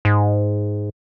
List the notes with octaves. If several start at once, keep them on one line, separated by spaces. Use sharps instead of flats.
G#2